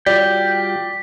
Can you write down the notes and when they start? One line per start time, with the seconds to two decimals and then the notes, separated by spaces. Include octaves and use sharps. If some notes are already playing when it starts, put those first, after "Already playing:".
0.06 G3 F4 F#4 D5 G5 B6